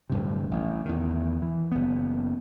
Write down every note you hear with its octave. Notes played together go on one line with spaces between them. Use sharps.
D1 G2 C3
A1
E2 D#3
E3
F#1 B3